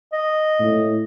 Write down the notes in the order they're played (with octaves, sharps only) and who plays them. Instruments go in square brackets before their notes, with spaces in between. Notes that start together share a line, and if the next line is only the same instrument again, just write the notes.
[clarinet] D#5
[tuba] A2